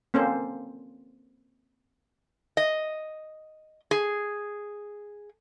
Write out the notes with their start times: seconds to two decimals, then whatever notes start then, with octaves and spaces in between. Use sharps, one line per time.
0.14 A#3 C4 C#4 A4 A#4 C5
2.57 D#5
3.91 G#4